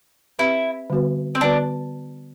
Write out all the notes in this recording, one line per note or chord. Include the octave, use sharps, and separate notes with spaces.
C4 E4 G4 B4
D3 G3 B3 F#4 B4
C4
D3 G3 B3 D4 F#4 B4